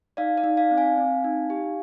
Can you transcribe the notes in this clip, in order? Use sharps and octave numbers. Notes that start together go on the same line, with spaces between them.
D#4 D5 F5
D5 F5
D#4
D5 F5
C4
F5 G#5
C4
D#4
G4